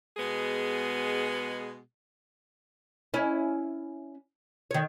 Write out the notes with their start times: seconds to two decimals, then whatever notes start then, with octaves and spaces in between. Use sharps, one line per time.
0.17 B2 G#3 B3 G#4
3.14 C#4 E4
4.71 D#3 C#5